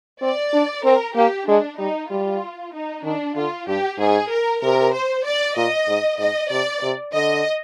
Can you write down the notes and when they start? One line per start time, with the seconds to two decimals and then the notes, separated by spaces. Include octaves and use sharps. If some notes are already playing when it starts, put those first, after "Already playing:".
0.22 C4 D5
0.53 D4
0.84 C4 A#4
1.16 A#3 G4
1.47 G#3 D4
1.78 G3 D#4
2.10 G3 F4
2.73 D#4
3.04 D#3 D4
3.36 D3 F4
3.67 G2 G4
3.99 G#2 G#4
4.30 A#4
4.62 C3 A#4
4.93 C5
5.26 D5
5.57 A#2 D#5
5.88 G#2
6.19 G#2 D#5
6.51 C3 D5
6.83 C3
7.13 D3 D#5